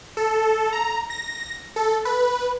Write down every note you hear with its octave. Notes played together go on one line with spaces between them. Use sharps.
A4
A#5
A#6
A4
B4